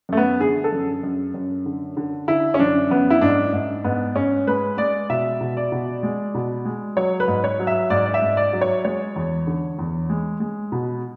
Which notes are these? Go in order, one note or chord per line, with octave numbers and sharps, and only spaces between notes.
F#2 A3
B3
D3 G#4
A4
F#2
F#2
F#2
D3
D3
D3 E4
C#4
F#2 D4
F#2 B3
E4
G#2 D4
G#2
G#2 B3
G#2 C#4
G#3 B4
G#3 D5
B2 E5
B2
D5
B2
G#3
B2
G#3
F#3 C#5
B4
G#2
C#5
F#3
E5
G#2 D5
D5
E5
G#2
D5
F#3
C#5
G#3 C#5
E2
D3
E2
G#3
G#3
B2